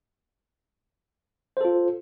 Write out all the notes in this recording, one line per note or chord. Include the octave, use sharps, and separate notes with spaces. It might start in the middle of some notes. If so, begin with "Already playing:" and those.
F4 A4 C5